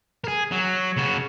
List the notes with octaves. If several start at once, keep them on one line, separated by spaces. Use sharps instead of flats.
G#4 A#4
F#3
C#3 F#4